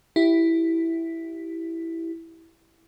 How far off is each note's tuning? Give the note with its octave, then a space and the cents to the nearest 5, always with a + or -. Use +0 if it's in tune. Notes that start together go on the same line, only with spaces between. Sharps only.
E4 +0 G4 -15